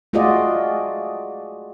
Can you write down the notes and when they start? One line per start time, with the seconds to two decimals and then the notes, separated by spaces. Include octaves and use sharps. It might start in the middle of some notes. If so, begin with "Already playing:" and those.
0.13 A3 F4 F#4 G#4 D5 D#5